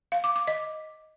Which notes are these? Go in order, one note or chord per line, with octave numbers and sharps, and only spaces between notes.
F5
D6
D6
D#5